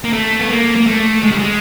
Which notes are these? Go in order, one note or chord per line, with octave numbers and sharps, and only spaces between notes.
A#3
A3
B3
A#3
A#3
A3
G#3
G3
G#3